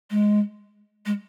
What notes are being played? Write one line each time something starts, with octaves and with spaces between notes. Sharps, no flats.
G#3
G#3